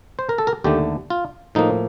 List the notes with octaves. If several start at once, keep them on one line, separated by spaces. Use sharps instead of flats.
C5
A#4
A4
A#4
D#2 D3 A3 G4
F4
A2 F3 A#3 D#4